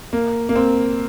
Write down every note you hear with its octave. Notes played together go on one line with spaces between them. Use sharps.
A#3
A#3
C4